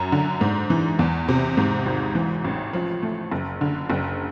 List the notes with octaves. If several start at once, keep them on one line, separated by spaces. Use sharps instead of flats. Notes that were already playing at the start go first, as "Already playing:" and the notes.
Already playing: F#2
D3
G#2
E3
E2
C3
G#2
G#1
E3
A1
F3
A3
F#1
D3
F#1